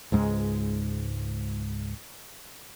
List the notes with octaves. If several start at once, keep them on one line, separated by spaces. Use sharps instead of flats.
C#2 G#2 G#3